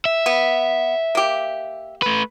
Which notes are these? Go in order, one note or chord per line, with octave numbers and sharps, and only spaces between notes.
E5
B3
A#3 G4
A3 B4